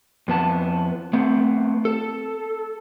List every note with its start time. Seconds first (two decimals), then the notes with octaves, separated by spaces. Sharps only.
0.28 F2 B3 A5
1.13 A3 B3 C4
1.85 A4